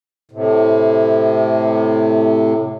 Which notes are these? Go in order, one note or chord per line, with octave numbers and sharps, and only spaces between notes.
A2 C3